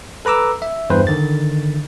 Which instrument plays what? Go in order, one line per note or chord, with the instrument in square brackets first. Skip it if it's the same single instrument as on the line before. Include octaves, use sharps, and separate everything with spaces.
[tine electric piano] A4 B4 A#5 D6 E6
E5
E2 G2 E3 B4 C5
D3 D#3 A6